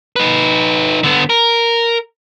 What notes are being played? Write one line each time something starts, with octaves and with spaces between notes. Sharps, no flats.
D#4 B4
D3 B3
A#4